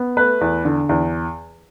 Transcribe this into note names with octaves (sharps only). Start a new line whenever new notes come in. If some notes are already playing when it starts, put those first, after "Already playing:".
Already playing: B3
A3 B4
E2
D3
E2